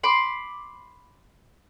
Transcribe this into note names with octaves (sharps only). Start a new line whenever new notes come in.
B5 C6 D6